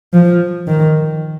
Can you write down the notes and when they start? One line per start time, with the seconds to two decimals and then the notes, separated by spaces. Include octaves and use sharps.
0.13 F3
0.67 D#3